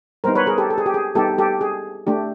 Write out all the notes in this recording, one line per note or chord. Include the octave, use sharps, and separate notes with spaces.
G3 B3 D#4 A#4 C5
B4 C#5
G#4 A#4
G4 A4
A4
G#4
G4
G#4
G3 B3 D#4 G4 A4
G4 A4
G#4
A3 D4 G4